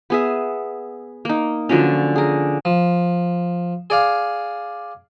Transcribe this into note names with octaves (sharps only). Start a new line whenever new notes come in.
B3 G#4 E5
A#3 D#4
D3 F3 F#3 C#4
G#4 A#4
F3
G#4 D5 F5